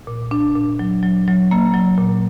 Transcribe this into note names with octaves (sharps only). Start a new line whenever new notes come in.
A#2
D4
A#2
F#3
F#3
F#3
A#3
F#3
A#2